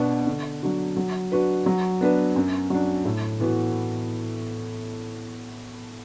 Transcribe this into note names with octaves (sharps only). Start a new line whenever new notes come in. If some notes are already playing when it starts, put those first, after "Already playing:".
Already playing: B2 B3 D4
D3
F#3 D4 F#4
F#3
D4 F#4 B4
F#3
B3 D4 B4
F#2
F#3 D4
A2
E3 B3 F#4